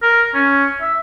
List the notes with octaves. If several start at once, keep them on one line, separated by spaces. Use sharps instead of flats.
A#4
C#4
E5